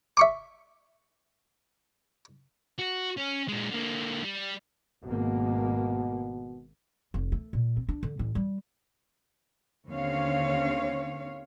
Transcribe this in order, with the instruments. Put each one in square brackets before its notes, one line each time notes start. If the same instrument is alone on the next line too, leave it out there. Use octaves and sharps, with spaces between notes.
[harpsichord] E5 C#6 D6
[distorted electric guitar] F#4
C#4
A#2 G#3
D3 A#3
G3
[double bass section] G#1 A#3 [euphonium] B2
[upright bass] F1
A3
A#2
C4
D4
D3
A1
G3
[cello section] D#2 D3 C4 C#4 C#5 F5